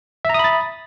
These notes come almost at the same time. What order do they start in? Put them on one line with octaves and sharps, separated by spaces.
E5 A#5 D#6 B5 A6